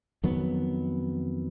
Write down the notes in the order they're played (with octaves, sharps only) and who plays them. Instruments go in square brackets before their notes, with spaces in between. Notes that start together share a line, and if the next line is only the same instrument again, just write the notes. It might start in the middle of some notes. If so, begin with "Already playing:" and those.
[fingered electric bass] F2 D#3 F#3 B3